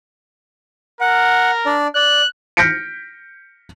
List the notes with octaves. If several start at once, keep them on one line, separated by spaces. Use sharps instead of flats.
A#4 F#5
D4 D5
D5 F#6
F6 G6 A#6 B6 C#7 D7